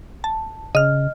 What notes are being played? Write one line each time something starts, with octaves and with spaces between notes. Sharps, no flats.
A5
C#3 D#5 F6